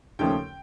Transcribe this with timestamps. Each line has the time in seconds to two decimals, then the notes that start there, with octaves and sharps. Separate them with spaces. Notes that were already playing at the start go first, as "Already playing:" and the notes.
0.19 D#2 C#3 F3 A3 C#4 G5